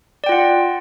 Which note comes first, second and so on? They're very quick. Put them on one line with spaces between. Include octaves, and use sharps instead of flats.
D5 G5 F4 F#5